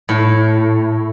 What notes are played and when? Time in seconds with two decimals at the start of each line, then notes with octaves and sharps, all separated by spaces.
0.09 A2